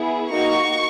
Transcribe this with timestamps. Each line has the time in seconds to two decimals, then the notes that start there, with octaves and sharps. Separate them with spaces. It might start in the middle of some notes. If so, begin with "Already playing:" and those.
Already playing: B3 E4 G#4
0.31 A#3 D#4 F#4 C#6